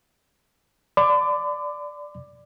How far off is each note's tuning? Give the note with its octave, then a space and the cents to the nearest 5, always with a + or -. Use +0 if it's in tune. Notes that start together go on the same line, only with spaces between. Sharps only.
D5 +0 B5 +45 D6 +15